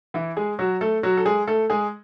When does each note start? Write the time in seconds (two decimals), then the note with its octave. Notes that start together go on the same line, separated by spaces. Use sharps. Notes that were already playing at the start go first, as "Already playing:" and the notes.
0.14 E3 E4
0.37 G#3 G#4
0.59 F#3 F#4
0.81 A3 A4
1.03 F#3 F#4
1.17 A4
1.26 G#3 G#4
1.47 A3 A4
1.70 G#3 G#4